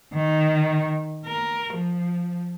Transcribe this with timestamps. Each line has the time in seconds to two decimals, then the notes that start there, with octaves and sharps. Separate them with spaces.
0.14 D#3
1.26 A#4
1.73 F3